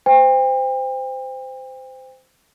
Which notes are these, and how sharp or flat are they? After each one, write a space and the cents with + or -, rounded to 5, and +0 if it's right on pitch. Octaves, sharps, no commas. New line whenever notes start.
C5 -20 G5 +35